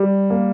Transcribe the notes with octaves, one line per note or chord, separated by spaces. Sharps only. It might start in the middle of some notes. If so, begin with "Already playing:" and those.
Already playing: G3
A#3